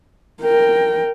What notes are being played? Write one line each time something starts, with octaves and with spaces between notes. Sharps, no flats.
A#4 G5